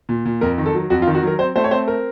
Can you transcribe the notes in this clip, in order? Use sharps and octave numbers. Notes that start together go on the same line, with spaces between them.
A#2
A#2
F2 A#4
D#3
A4
F#3
F2 F#4
F4
D#3
F#4
F#3 A#4
C4 C5
A3 C5
C#5
C4 C5
A#4